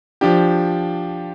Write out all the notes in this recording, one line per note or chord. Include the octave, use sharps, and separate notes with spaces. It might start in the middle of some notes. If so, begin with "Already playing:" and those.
F3 D4 G4